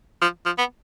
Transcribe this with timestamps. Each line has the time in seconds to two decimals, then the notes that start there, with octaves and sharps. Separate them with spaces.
0.22 F3
0.46 F3
0.58 B3